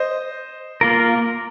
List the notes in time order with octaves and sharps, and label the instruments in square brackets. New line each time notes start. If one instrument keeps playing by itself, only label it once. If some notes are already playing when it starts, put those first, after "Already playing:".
Already playing: [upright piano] C5 D#5
[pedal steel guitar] A#3 F4 A#4